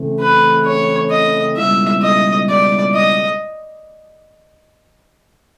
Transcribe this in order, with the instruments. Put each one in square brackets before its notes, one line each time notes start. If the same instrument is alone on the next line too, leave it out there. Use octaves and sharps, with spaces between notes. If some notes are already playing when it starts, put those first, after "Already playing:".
Already playing: [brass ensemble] C#3 E3 A3 C4
[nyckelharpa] B4
C#5
D#5
[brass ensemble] C#2 B2 G3 C4 E4 [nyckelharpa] E5
[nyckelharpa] D#5
D5
D#5